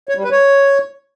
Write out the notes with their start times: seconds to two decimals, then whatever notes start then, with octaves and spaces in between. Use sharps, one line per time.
0.09 C#5
0.17 G3
0.24 B4
0.32 C#5